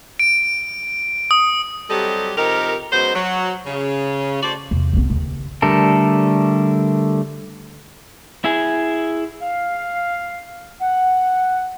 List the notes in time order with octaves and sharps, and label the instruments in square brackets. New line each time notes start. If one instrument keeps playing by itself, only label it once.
[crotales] D7
D#6
[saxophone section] F#3 G3 C4 G4 A4 D#5
C3 F3 D#4 G4 A#4
F#2 B2 G#3 B3 C5
F#3
C#3
A3 F#4 C5 D5
[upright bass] E2 C3
C2 B3
D#2 C#3
[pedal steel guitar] D3 G3 A3 A4 A#4
[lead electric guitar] E4 G#4
[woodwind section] F5
F#5